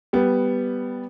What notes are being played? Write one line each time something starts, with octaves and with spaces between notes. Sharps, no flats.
G3 B3